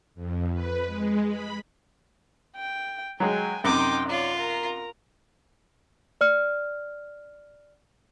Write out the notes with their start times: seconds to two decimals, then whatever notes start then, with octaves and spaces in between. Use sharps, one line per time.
0.15 F2
0.53 B4
0.87 G#3
1.27 B5
2.57 G5
3.20 F#3 G#3 G5 G#5
3.64 F#2 C3 D#4 G5 C6 D6
4.09 F4 C#5 D5
4.38 A#4 A#5
6.21 D5 F6